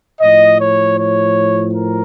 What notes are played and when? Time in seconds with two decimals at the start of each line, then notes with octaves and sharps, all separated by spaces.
0.21 A2 F3 D#5
0.58 C#5
0.97 C#5
1.73 A#4